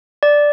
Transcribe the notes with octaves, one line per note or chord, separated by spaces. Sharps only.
D5